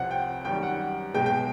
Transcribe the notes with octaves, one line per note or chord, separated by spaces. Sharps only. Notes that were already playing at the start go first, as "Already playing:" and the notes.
Already playing: C2 C3 F3 F#5
G5
F#2 D#3 G3 G5
F#5
B1 B2 G#3 G5
G5